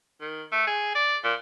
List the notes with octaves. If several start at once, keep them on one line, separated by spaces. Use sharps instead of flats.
D#3
A3
G#4
D5
A#2